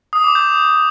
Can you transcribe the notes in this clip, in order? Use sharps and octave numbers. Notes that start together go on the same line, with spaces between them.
D#6
D6
G6